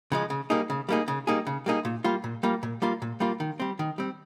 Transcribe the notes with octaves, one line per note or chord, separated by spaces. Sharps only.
C#3 F3 G#3
C#3
G3 A#3 D#4 G#4
C#3
G3 A#3 D#4 G#4
C#3
G3 A#3 D#4 G#4
C#3
G3 A#3 D#4 G#4
A#2
G3 A#3 F4
A#2
G3 A#3 F4
A#2
G3 A#3 F4
A#2
G3 A#3 F4
D#3
G3 C4
D#3
G3 C4